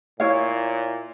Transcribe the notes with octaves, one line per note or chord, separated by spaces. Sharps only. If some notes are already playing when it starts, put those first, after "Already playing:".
A#2 E4 C#5 F5